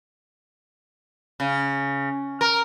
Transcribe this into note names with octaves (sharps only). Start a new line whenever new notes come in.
C#3
A#4